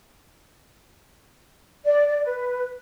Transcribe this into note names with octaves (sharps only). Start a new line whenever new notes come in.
D5
D5
B4